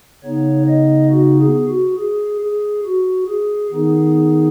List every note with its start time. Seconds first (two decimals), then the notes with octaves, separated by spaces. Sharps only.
0.24 C#3 B3 D#4 C#5
0.68 D#5
1.11 F#4
1.40 G#4
1.69 F#4
1.98 G#4
2.41 G#4
2.85 F#4
3.28 G#4
3.72 D#3 B3 D#4 G#4